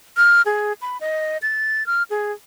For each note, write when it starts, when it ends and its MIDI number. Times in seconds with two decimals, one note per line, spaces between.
0.17 0.42 89
0.46 0.73 68
0.82 0.98 83
1.01 1.37 75
1.42 1.86 93
1.86 2.03 89
2.10 2.32 68